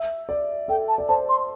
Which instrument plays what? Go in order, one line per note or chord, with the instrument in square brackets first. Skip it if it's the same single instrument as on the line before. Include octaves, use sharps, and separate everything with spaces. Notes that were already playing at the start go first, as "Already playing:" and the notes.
Already playing: [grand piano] E5
D5
[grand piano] A4 [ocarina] G5
[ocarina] A5
[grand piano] D5
[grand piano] C5 [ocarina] A5
[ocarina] C6